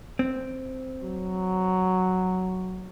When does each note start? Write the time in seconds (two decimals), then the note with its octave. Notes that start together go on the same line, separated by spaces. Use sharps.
0.19 C4
1.03 F#3